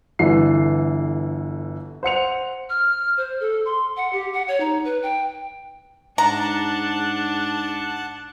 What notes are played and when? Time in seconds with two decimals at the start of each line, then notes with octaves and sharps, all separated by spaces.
0.19 G1 D3 E3 C7
2.03 C5 F#5 C#7 F7
2.70 F6
3.17 C5
3.40 A4
3.65 C6
3.97 F#5
4.13 G4
4.33 F#5
4.48 C#5
4.60 D#4
4.84 B4
5.03 G5
6.18 G#2 D4 F#5 A5 A#5